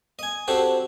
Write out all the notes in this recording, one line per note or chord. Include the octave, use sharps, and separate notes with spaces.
D#5 G#5
C4 D4 F#4 G4 A4 C5